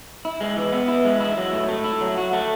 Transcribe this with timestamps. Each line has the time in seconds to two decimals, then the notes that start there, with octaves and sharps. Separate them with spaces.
0.25 E4
0.41 G#3
0.57 E3
0.72 B3
0.88 E4
1.05 G#3
1.20 E4
1.37 F#3
1.53 A2
1.69 A3
1.84 E4
2.01 F#3
2.18 F#4
2.33 A3